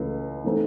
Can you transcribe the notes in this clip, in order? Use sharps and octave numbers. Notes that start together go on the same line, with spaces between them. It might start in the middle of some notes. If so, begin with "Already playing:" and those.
Already playing: C#2 C#3 E3 A3
E3 A3 C4 D#4